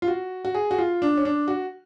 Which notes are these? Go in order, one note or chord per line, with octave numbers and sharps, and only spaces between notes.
F4
F#4
F#4
G#4
F#4
F4
D4
C#4
D4
F#4